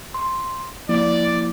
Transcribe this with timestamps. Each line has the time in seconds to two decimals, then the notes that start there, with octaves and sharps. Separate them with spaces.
0.14 C6
0.89 F3 A#3 E4 D5